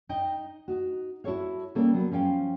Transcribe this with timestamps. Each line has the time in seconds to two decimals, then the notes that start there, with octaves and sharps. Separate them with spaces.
0.09 D#4 D#5 G5
0.68 D#4 F#4
1.24 E4 F#4 A4 C#5 F5
1.75 C#3 G3 A#3 A4 A#4
1.94 F#3 B3
2.11 F3 C#4 F5 G5